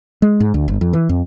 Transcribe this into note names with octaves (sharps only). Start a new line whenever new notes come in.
G#3
G#2
D2
G1
F2
E3
F2